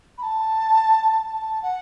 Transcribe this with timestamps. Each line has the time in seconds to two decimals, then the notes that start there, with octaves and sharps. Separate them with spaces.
0.18 B5
0.23 A5
1.33 A5
1.63 F#5